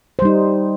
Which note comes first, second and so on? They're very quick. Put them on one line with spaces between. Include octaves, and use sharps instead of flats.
C5 G3 D#4